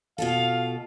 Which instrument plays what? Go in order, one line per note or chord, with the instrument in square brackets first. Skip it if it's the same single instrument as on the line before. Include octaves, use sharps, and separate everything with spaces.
[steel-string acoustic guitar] B2 F4 A4 [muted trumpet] F5